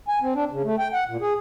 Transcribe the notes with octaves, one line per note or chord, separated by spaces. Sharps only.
G#5
C4
D4
C#3
A3
G5
F#5
A#2
G#4